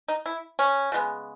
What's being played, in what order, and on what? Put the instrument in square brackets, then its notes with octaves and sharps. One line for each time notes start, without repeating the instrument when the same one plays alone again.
[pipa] D#4
E4
C#4
C#3 G#3 B3